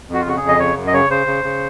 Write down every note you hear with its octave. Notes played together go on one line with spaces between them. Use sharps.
F2
F#4
F4
C#3 F#4
G#4
F2
D#5
C#3 C#5
F#2
D#5
C#3 C#5
C#3 C5
C#3
C#3